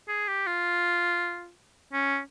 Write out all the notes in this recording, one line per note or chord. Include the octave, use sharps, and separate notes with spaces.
G#4
G4
F4
C#4